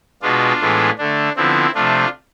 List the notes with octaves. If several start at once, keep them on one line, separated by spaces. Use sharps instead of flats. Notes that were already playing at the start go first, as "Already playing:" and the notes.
B2 G#3 B3 D4 F4
A2 E3 G#3 B3
D3 A3 D4
D3 F3 B3 C4 E4
C3 F3 A3 D4 F4